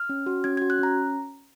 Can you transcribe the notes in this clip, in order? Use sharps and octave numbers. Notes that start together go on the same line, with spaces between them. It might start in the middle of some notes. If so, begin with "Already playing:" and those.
Already playing: F6
C#4
F#4
C#4 G#6
F#4 G#6
F#6
C#4 A#5